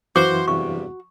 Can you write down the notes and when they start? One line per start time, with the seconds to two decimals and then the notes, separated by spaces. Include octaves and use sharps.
0.16 F#2 E3 F#4 C5 F5 D6
0.48 E2 G2 C3 C#6